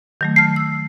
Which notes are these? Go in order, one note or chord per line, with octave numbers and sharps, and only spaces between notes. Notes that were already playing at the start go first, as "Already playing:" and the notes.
D#3 F#3 A3
A5 F6 C7
E6